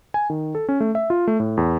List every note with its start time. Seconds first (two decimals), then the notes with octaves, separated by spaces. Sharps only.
0.14 G#5
0.30 D#3
0.55 A4
0.69 C#4
0.80 A3
0.95 E5
1.10 F4
1.27 A3
1.40 A2
1.57 E2